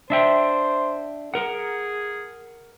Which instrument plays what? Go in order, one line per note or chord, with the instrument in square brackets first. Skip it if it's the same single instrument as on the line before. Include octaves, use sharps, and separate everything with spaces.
[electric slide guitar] D4 E5 G5 [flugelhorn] C5
[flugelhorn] G#4 [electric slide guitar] A#4 F#5